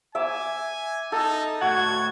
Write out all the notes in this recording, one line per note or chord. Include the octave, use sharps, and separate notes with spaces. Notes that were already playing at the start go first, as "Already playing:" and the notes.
E5 G#5 D6
D#4 A4
A2 F#4 F#5 G#6